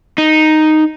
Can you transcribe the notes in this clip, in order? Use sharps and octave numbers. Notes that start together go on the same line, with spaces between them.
D#4